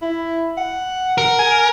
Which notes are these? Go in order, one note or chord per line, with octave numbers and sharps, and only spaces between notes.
E4
F#5
A#4
G#5